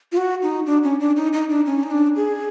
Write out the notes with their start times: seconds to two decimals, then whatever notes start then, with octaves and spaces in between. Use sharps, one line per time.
0.12 F4
0.17 F#4
0.42 D#4
0.66 D4
0.83 C#4
1.00 D4
1.16 D#4
1.33 D#4
1.50 D4
1.66 C#4
1.83 D#4
1.91 D4
2.16 G#4